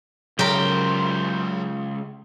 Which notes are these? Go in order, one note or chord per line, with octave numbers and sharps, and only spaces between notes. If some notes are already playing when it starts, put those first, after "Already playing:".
C#2 C#3 F#3 G4 A#4 C5